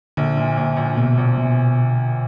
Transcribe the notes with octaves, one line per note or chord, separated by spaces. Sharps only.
A#1 D3
A#2
A#1
A#1
A#1 B2
A#1
B2